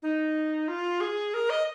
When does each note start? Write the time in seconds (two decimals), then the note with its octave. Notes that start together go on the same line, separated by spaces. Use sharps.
0.02 D#4
0.68 F4
1.01 G#4
1.34 A#4
1.50 D#5